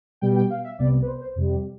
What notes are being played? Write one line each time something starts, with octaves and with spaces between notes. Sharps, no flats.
B2 G3 B3 G5
G5
F5
E5
C2 C3 G3 B3 D5
B4
C5
C5
F2 C3 G3